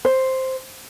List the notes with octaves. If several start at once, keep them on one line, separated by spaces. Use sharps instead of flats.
C5